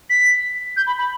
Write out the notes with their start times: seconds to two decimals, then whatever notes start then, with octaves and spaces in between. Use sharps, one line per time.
0.10 B6
0.77 G6
0.87 B5
0.99 B5